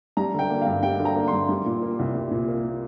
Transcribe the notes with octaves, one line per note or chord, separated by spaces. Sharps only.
G3 A#5
D3 G5
A#3
F5
G2
G3 G5
D3
A#5
A#3
G2 C6
G3
A#2
A#3
C2
G3
A#2
A#3